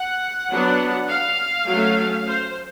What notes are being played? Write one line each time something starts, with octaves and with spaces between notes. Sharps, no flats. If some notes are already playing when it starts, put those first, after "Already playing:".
Already playing: F#5
F#3 B3 D4
F5
F#3 A3 C#4
C5